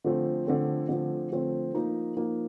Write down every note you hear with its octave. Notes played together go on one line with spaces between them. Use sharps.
D3 F3 A3 C4
D3 F3 A3 C4
D3 F3 A3 C4
D3 F3 A3 C4
F3 A#3 D#4
F3 A#3 D#4